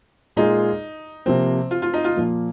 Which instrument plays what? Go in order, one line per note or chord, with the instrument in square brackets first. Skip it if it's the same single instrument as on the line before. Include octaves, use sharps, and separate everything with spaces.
[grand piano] A#2 G#3 F4 G#4 [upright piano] D#4
[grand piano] C3 F3 A#3 [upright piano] C4
[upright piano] F4
F4
D#4
F4
[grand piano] A#2 F3 A#3